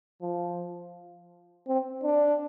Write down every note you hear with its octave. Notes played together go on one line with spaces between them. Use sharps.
F3
C4
D4